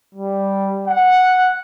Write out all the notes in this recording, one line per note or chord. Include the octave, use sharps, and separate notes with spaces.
G3
F#5